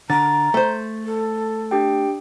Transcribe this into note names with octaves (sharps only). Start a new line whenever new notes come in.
D3 A#5 A6
A3 C5
A4
D4 G4 G5